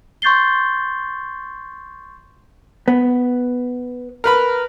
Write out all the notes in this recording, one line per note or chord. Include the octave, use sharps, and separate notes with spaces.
C6 C#6 G6 A6 C7 G7
B3
A#4 B4 B5